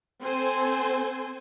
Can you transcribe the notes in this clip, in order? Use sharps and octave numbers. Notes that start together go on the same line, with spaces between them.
C4 A4 C5 G#5